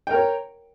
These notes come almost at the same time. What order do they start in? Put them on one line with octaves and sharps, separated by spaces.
G5 A#4 C#5